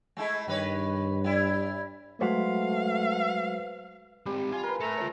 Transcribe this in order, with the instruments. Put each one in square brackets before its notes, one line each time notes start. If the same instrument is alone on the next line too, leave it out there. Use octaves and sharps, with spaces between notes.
[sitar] G#3 A3 E4
[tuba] G2 [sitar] D#3 B4 C#5
[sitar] G3 E4
[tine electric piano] F#3 G#3 F#4 [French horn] A3 [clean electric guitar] B4 C5 F#5 [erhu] F5
[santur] G3 [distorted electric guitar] G#3 C4
[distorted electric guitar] F4 F5 [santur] G#5
[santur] A#4 B4
[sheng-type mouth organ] A3 A#5 [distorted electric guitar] A4 B5
[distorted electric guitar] F4 C#5